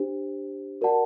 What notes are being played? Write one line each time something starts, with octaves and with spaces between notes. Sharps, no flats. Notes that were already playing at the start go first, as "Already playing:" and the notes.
Already playing: D4 G4 C5
F#4 A#4 D5 F#5 A5